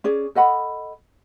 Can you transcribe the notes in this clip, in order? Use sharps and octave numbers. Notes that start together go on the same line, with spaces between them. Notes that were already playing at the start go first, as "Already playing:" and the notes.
C#4 G#4 D5
A4 D#5 F#5 B5